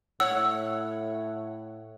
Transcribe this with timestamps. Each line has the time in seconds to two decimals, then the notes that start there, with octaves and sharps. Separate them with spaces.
0.20 A2 C#5 F#5 E6